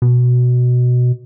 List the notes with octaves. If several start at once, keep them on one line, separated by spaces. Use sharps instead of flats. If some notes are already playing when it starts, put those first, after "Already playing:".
B2